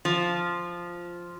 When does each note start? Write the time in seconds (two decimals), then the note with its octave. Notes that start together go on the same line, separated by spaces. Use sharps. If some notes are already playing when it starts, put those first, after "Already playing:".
0.05 F3